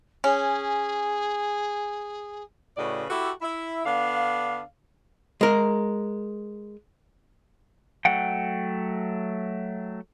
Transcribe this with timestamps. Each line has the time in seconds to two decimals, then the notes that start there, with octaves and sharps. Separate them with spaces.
0.24 C#4 G#4
2.77 A2 C#3 F#4 B4 D5 D#5
3.10 E4 F#4 G4 A4
3.42 E4 E5
3.85 D3 B3 D4 F5
5.41 G#3 A#4
8.05 F#3 A3 F#5 G5